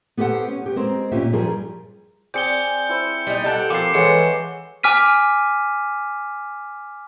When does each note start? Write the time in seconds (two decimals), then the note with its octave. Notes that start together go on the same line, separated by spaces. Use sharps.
0.17 B3 G4 A4 C5 F#5
0.48 C#4
0.62 B3 G4
0.76 G#3 C4 A#4 C5
1.12 A#2 C#4 F4 G4 E5
1.32 G2 F3 G3 G#4 A#4 G#5
2.34 C4 G#4 D5 G6 C#7 G7
2.89 E4 C5
3.27 G3 D#4
3.45 G4 A4 F#5
3.70 F3 A#3 C4 A4 D6 C7
3.94 E3 G#3 A4 C#5 F#5 A5 C#7
4.83 G#5 D6 F6 B6 D#7